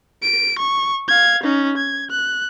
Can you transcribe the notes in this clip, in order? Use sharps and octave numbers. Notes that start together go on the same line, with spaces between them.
D7
C#6
F5 G#6
C#4 D#4
G#6
F#6